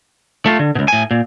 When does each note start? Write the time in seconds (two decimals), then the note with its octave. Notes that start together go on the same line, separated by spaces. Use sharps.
0.46 A3 F4
0.59 D3
0.75 C#2 B2
0.88 A2 G#5
1.11 A#2